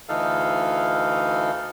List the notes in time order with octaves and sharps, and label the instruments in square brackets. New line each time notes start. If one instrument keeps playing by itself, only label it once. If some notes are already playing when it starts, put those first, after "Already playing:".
[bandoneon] D2 E3 D#4 A4 F5